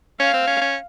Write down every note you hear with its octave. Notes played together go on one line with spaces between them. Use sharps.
C#4 F5
C4
C#4
C#4